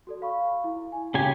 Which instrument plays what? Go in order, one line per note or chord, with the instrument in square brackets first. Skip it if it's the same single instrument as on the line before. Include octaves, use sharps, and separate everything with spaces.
[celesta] F#4 A4 D5
F5 B5 C#6
E4
G#5
[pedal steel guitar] C#3 G4 G#5 [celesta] F#4